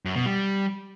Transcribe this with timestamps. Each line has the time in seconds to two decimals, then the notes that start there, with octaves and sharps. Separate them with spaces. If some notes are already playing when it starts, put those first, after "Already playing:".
0.05 F#2
0.16 B2
0.26 G3